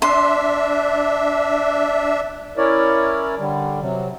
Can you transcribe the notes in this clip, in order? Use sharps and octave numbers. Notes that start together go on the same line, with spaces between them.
D4 E5 C6
C#4 E4 A#4 C#5 D5
D3 G3
C3 F#3